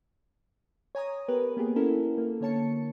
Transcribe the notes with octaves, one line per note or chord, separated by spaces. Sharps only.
C#5 G#5 A#5 D#6
B3 G4 A#4 B4
A#3 B3 G4 G#4
C#4 E4 F#4 A4 A#4
A#3
D3 A#3 C#5 A5 C#7